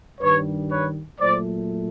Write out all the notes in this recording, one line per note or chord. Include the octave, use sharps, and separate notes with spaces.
G2 D#3 G3 B4 C#5
B4 C#5
A#2 F#3 A3 C5 D5